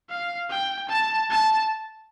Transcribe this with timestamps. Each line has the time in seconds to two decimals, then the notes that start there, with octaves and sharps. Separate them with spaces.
0.10 F5
0.50 G5
0.89 A5
1.30 A5